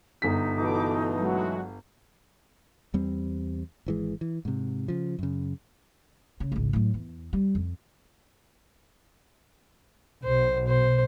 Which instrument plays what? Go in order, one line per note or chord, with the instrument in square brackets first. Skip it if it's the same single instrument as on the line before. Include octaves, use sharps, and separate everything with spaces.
[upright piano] G1 B6 [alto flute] D#4
[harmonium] B2 E3 A3 [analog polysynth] D6
[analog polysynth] F#3 G#3 F#4
[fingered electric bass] E2 G3 C4
G#1 E3 G#3
E3
G#2 C3
C#3 F3
F#2 C#3
[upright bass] C#3
G#1 C#2
A2 F#3
E2
G3
F2
[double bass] B1 B2 [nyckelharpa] C5
[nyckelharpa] C5